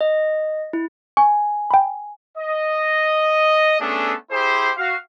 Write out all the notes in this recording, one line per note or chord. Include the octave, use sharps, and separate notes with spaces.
D#5
E4
G#5 C#6
G5 B5
D#5
A3 B3 C#4 D4 G#4 A4
E4 G4 G#4 C5
F#4 F5